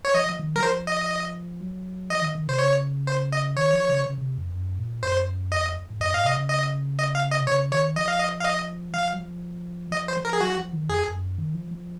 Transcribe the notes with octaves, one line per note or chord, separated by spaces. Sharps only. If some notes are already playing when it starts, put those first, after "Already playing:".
C#5
F3 D#5
F3
D#3
F#3 A#4
F3 C5
D#5
F#3
F3 D#5
D#3
D#3
C3 C5
C#3 C#5
C5
D#5
D#3 C#5
F3
C#3
C#3
C#3
C3
F2
F#2
A#2
F#2 C5
F2 D#5
G#2
F#2 D#5
G#2 F5
C3 D#5
C#3
D#5
D#5
F5
D#5
C3
C#3 C#5
D#3 C#5
F3 D#5
F5
D#5
F5
D#5
F3 F5
F#3
F3
F3 D#5
C5
F3
A#4
G#4
F#3 F#4
F3
D#3
F2 G#4
F2
F#2
D#3
F3
F3